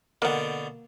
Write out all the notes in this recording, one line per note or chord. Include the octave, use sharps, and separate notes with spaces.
B2 D3 A#3 F#5